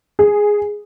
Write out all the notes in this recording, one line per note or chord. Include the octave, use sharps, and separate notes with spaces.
G#4